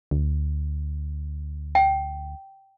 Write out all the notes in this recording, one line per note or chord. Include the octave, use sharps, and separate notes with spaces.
D2
G5